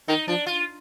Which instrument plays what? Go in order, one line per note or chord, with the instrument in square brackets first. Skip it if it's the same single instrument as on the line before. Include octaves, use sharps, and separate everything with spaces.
[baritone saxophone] D#3 [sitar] D#4
[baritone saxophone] F3 [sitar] D4
[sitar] F4